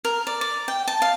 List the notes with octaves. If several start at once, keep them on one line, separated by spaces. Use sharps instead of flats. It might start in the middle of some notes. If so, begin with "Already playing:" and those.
A#4
D5
D5
G5
A5
F5